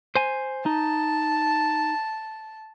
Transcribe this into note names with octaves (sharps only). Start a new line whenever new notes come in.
C5 G#5
D#4 A5